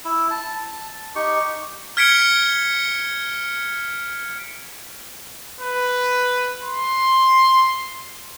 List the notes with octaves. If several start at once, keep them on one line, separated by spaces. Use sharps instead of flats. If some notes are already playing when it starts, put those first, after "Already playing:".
E4
A5
D#4 G4 C#6
F6 G#6 B6 C#7 D7 G7
B4
C6